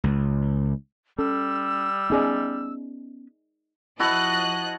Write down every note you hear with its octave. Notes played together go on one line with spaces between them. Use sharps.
C#2
G3 C#4 A4 E6
B3 C#4 D#4 G#4 D5
F3 E4 F#4 D#5 A5 F#6